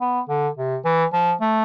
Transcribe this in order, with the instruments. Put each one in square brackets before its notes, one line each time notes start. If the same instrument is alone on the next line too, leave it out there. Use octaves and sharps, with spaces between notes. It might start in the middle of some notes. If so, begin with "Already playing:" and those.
[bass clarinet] B3
D3
C3
E3
F3
A3